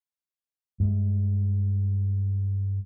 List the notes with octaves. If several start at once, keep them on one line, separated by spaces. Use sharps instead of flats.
G2 G#3